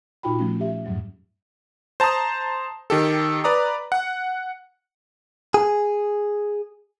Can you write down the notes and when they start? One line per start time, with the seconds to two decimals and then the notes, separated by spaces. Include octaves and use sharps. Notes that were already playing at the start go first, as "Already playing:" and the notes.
0.23 A#2 D#4 F4 F#4 G5 B5
0.39 F3 G3 A3 C#4
0.60 G4 E5
0.85 F2 G#2 F#3 G3
2.00 C5 A5 A#5 C6 D#6
2.90 D#3 G4 A4
3.44 B4 D5 A#5 D#6
3.92 F#5
5.54 G#4